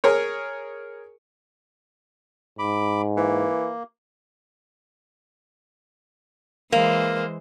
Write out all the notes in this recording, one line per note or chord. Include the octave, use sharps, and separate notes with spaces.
G#4 A#4 C#5
G#2 B5 D6
E3 A#3
E3 G#3 A#3 C5